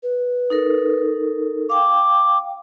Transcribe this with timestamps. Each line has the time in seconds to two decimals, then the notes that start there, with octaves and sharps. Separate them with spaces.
0.03 B4
0.50 D#4 A4 A#4
1.70 F5 G5 D6